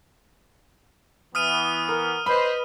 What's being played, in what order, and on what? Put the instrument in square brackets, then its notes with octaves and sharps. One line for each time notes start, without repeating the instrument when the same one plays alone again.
[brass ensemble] E3 B3 [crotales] D#6 F6 D#7
[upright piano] A#4
[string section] B4 D#5 [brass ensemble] C5 [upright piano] B5